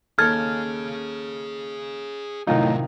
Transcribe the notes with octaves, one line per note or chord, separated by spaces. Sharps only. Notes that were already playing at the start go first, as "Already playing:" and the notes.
D#2 G#4 A4 C#5 F6 G#6 A6
C2 F#2 A2 C3 D#3 D#4 F4